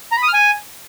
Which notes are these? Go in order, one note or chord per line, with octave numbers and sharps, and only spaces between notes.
A#5
B5
D#6
F6
G#5